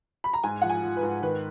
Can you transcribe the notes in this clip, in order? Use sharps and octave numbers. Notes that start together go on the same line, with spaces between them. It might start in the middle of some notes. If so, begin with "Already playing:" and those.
B5
A#5
G#2 G#5
F3 F#5
G#5
F3
B4
G#2
D#3 B4